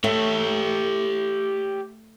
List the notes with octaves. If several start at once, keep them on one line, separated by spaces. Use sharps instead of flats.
A3 G4 C#5